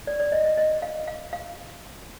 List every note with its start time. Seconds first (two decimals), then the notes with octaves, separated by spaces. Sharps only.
0.07 D5
0.20 D5
0.32 D#5
0.45 D#5
0.57 D#5
0.82 F5
1.07 F5
1.33 F5